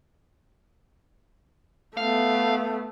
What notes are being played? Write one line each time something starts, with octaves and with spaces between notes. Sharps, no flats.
A3 B3 F5